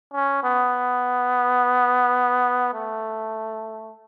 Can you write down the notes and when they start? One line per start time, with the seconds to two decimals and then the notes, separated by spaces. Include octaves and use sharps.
0.14 C#4
0.44 B3
2.74 A3